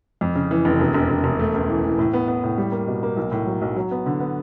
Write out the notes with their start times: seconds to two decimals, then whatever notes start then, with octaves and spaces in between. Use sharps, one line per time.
0.21 F2
0.35 C#3
0.51 E3
0.65 F1
0.80 E1
0.94 E1
1.10 E1
1.24 E1
1.39 A3
1.54 C#2
1.69 E3
1.84 E3
1.99 A2
2.13 B3
2.28 B3
2.44 A2
2.58 G3
2.72 A#3
2.87 B2
3.03 A#3
3.17 B1
3.32 A2
3.47 F#3
3.62 B1
3.76 F#3
3.91 B3
4.06 D3
4.20 B3